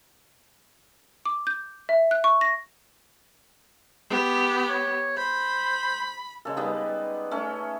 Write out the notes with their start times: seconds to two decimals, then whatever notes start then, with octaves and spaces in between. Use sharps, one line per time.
1.25 D6
1.47 G6
1.89 E5
2.11 F#6
2.24 C#6
2.41 A#6
4.10 B3 G4
4.69 C#5
5.17 C5 B5
6.45 C#3 G#3 A#3 A4
6.57 G3 B3 D#4 G#4 B4
7.31 A3 C#4